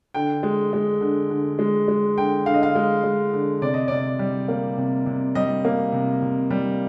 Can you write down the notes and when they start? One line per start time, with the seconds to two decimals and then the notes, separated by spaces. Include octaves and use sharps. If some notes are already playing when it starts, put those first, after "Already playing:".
0.14 D3 G5
0.43 G#3
0.73 G#3
1.01 D3
1.30 D3
1.59 G#3
1.88 G#3
2.18 D3 G5
2.46 D3 F5
2.54 D#5
2.63 F5
2.75 G#3
3.04 G#3
3.33 D3
3.62 C3 D5
3.74 D#5
3.88 C3 D5
4.19 G3
4.48 A#3
4.77 C3
5.06 C3
5.35 G3 D#5
5.65 A#3
5.92 C3
6.22 C3
6.50 G3